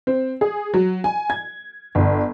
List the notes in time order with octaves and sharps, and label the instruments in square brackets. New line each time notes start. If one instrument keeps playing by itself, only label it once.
[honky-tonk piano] C4
G#4
F#3
G#5
G#6
G1